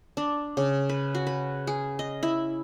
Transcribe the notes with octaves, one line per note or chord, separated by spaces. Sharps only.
D4
C#3
B4
F#4
B4
G#4
D#5
E4